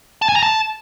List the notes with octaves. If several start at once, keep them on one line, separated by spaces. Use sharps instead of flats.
A5
G#5
A#5
A5